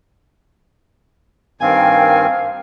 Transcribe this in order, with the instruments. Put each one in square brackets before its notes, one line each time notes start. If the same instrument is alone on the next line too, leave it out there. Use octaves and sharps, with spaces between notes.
[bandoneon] G2 D#3 C4 [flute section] A#4 G5 [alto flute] F5 [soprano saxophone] G#5